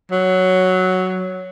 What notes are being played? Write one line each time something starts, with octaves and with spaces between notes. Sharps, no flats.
F#3